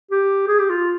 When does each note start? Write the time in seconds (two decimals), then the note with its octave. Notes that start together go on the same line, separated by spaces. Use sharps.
0.11 G4
0.48 G#4
0.59 G4
0.70 F4